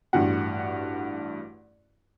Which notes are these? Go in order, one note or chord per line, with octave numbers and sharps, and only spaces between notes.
A1 G2 F#4 F#5